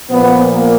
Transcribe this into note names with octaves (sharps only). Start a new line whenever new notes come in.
A#2 F3 B3
A#3